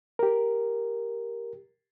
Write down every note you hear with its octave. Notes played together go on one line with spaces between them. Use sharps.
G4 A#4